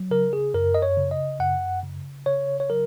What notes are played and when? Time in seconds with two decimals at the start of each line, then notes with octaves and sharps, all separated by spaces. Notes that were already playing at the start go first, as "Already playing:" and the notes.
Already playing: F#3
0.11 C#3 A#4
0.33 G#4
0.54 F#2 A#4
0.74 D#5
0.82 C#5
0.97 C#3
1.11 D#5
1.40 F#2 F#5
1.83 C#3
2.26 C#3 C#5
2.60 C#5
2.70 F#3 A#4